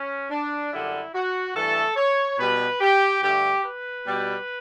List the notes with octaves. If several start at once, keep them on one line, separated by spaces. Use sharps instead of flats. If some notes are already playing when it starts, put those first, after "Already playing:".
Already playing: C#4
D4
F#2 D3 G3 E4
F#4
G2 E3 A3 A4
C#5
B2 G3 B4
G4
G2 D3 A3 G4
B4
B2 G3